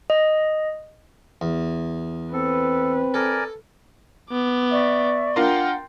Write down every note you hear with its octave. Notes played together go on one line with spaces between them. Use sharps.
D#5
E2
C4 A4 B4
A4 A#4 D5 G#5
B3 D6
D5 E5 C#6
D4 F4 A#4 F#5 G5 C6